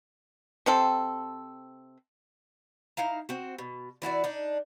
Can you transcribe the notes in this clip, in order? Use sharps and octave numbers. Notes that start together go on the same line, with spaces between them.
C3 C4 A4
D#4 E4 F5 A#5
C4 F#4
B2
E3 E4 F#4 D5
D4 D#4